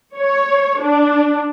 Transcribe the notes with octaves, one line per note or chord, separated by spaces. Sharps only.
C#5
D4